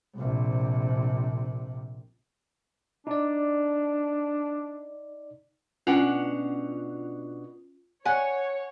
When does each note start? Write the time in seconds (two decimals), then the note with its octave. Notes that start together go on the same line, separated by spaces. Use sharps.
0.17 A#1 C3
3.07 D4 D#4 D5
5.87 B2 C#4 D4 F4 F#5 G#5
8.05 C#5 F#5 G#5